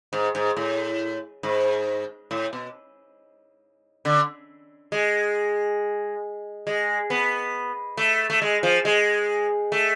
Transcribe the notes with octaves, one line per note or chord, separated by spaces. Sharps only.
G#2
G#2
A2
G#2
A2
B2
D3
G#3
G#3
B3
A3
A3
G#3
F3
G#3
A3